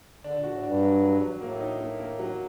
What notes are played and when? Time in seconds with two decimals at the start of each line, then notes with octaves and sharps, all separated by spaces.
0.24 D3 D4
0.38 A#2
0.43 F#4
0.50 A2
0.63 G2 D4
0.82 F#3
1.02 F#3
1.21 F#3
1.41 A2 A#3
1.60 D#4
1.80 A#3
1.99 A#3
2.19 F#3